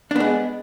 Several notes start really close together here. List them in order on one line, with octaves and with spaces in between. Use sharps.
D4 B3 G#3